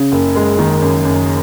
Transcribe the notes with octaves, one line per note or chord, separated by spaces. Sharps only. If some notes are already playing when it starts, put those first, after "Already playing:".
Already playing: C#3
F#1
G#3
D#3
F#2
F#2